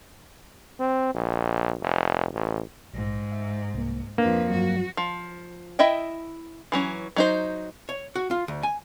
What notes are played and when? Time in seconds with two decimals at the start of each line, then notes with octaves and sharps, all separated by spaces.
0.79 C4
1.14 A#1
1.81 F1
2.33 A1
2.94 A#1 G#2
3.32 E5
3.74 C2 A#3
4.18 F2 A#3 D4 B4
4.50 G2 F#3 F#4
4.97 F3
5.79 E4 D#5 E5 G5
6.72 E3 F#3 C#4
7.16 F#3 D#4 C5
7.89 C#5
8.16 F#4
8.31 F4
8.48 D2
8.63 G#5